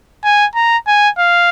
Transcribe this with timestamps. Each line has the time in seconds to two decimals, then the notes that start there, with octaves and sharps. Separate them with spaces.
0.24 G#5
0.55 A#5
0.87 G#5
1.18 F5